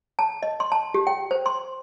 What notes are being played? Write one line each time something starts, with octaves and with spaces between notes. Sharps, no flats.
A5
D#5
C6
A5
G4
G5
C5
C6